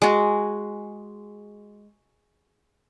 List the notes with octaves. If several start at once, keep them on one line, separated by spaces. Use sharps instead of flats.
G#3 F#4